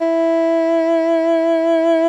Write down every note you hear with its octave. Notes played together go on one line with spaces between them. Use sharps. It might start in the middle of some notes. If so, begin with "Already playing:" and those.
E4